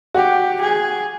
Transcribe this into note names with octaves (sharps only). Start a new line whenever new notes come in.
F#4 G4
G#4